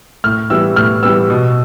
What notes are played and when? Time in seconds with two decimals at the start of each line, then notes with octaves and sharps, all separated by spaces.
0.24 A2 F6
0.50 E3 G3 B3 E6
0.76 A2 F6
1.03 E3 G3 B3 E6
1.30 B2